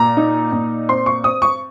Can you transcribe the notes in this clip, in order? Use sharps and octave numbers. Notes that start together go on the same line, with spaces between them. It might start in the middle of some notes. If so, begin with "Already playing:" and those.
Already playing: A#2 A#5
D#4
A#2
C4 C6
C#6
C4 D#6
C#6